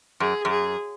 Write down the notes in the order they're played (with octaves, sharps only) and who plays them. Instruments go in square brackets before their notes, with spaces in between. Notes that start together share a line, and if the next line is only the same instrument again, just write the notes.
[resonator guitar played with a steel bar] F#2 [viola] G#4
[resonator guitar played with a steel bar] F#2
[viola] G#4